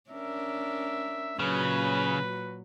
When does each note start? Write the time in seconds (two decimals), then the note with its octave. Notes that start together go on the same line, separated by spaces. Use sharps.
0.10 C#4 D4 A#4 E5
1.39 A#2 C#3 F#3 F#4 B4